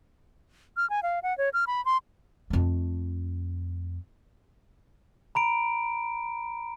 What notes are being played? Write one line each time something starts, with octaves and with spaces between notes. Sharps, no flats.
F6
G#5
F5
F#5
C#5
F6
B5
C6
F2 A3
A#5 B5 D7